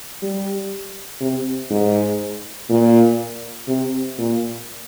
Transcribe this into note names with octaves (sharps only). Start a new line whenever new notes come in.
G3
C3
G#2
A#2
C3
A#2